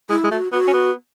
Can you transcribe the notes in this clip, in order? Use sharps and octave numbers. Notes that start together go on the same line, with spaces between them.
G#3 E4
G#3
A3 F#4
B3 F#4
C#4
B3